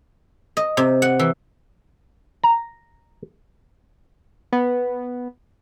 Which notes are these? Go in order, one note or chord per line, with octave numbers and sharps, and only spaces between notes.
D#5
C3
F#5
E3
A#5
B3